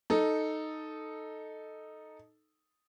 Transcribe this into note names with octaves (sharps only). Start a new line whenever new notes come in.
D#4 A4